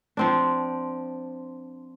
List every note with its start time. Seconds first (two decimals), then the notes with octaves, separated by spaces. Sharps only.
0.17 F3 C4 D4